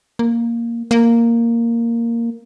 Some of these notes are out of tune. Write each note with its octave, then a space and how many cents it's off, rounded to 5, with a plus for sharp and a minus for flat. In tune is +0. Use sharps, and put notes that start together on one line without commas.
A#3 +0
A#3 -5